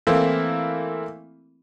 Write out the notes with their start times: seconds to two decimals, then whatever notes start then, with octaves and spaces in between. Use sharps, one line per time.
0.07 E3 A3 A#3 C4 E4